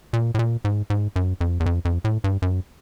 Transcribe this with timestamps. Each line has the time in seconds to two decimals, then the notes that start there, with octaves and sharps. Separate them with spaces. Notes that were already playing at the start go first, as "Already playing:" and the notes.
0.13 A#2
0.35 A2
0.39 A#2
0.65 G#2
0.90 G#2
1.16 F#2
1.41 F2
1.60 E2
1.66 F2
1.85 F2
2.05 A2
2.24 G2
2.42 F#2